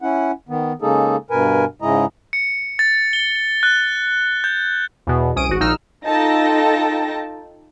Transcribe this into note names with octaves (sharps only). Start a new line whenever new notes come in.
C#4 E4 F#5
D#3 B3
C#3 G#3 A#3 D#4 G#4 A4
G2 B2 A#4 B4 G#5
G#2 C#3 G#3 E4 D#5 A#5
C#7
A6
G7
F#6
G6
E2 B2
C2 C#4 D#6 D7 D#7
G#1 F#4
A#1 D#4 E6 F6
D#4 F4 A4 G5 A5 A#6